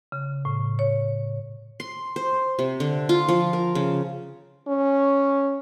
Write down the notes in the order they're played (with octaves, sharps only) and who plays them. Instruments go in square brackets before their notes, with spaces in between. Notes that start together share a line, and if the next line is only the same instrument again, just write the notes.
[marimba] C#3
A2
C#5
[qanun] C6
C5
C3
D3
F4
F3
A#4
C#3
[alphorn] C#4